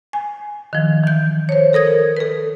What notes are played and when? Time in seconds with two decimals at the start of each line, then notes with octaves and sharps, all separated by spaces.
0.13 G#5
0.73 D#3 F3
1.04 E3 G6
1.49 C5 C#5
1.73 A4 A#4 D#6 G#6
2.17 A4 B4